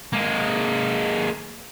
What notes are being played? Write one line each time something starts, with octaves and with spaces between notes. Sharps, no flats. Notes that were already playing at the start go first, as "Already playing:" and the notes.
G#3 A#3